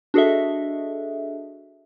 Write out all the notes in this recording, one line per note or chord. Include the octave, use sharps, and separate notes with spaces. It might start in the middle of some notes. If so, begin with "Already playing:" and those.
D4 F#4 G#4 A4 D#5 E5